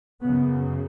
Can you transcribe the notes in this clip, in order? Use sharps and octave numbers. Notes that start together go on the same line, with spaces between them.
F#2 C#3 B3